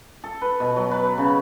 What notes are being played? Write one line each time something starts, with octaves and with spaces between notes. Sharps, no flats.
A4
B4
B2
F#3
B4
C#3